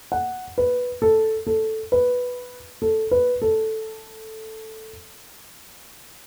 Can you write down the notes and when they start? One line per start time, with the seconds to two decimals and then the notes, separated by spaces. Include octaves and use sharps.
0.12 F#5
0.58 B4
1.02 A4
1.47 A4
1.92 B4
2.82 A4
3.11 B4
3.42 A4